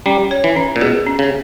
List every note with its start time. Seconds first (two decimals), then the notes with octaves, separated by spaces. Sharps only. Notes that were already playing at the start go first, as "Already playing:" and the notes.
0.06 G3 C#4
0.31 C#5
0.44 E3
0.57 C#4
0.76 A#2
0.81 B2 G#4
1.07 C#4
1.19 C#3